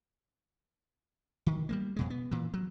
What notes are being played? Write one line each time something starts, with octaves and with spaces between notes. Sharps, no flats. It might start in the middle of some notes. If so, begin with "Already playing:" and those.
D#3
G3 G#3 A#3
F2 B2 G#3
B3
A#2 E3
F#3